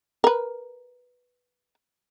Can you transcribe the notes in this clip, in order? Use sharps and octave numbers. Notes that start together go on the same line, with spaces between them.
A#4 B4